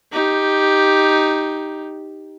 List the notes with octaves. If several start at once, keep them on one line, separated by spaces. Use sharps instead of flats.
D#4 G4